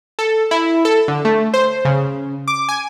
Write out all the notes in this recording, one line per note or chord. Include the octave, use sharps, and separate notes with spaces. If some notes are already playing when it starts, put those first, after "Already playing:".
A4
E4
A4
D3
A3
C5
C#3
D6
G#5